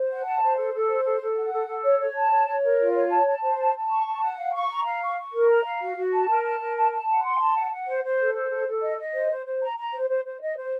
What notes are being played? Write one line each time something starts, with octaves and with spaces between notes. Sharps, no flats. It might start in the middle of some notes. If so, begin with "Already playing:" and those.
Already playing: C5
F#5
A5
C5
A4
A4
C5
A4
A4
F#5
A4
A4
C#5
C#5
A5
C#5
C#5
A#4
F4
C#5
A5
A5
C5
A5
A5
C#6
A5
F#5
F5
C#6
A#5
F5
C#6
C#6
A#4
A#5
F5
F#4
F#4
A5
A#4
A5
A#4
A5
A5
F#5
C6
A5
F#5
F#5
C5
C5
A4
C5
A4
A4
D#5
D#5
C5
C5
C5
A#5
A#5
C5
C5
C5
D#5
C5